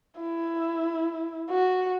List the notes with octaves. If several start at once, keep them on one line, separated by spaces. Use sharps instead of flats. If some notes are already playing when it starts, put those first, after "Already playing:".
E4
F#4